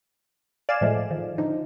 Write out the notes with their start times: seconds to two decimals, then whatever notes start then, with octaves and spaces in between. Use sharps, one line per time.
0.69 D5 F5 G#5 E7
0.81 A2 F3 G#3 A3
1.10 D#3 F3
1.38 D3 F3 D#4